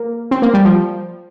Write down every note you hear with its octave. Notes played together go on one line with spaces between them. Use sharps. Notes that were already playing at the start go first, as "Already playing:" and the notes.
Already playing: A#3
C4
A#3
G3
F3